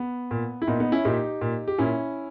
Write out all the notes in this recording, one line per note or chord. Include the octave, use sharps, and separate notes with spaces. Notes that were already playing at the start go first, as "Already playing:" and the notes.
Already playing: B3
A#2
E4
A#2 B3 D#4
B3 D#4
C#4 E4
A#2 D#4 G4
A#2
G4
A#2 C#4 E4